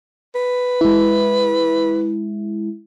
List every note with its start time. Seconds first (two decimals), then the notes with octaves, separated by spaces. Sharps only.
0.35 B4
0.81 G#3 E4